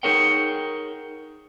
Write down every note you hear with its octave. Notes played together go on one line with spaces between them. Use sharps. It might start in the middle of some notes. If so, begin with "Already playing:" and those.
D#4 G#4 A#4 C#5 F#5 G5